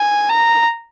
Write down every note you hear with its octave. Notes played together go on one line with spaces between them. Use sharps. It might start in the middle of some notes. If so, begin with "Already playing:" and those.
Already playing: G#5
A#5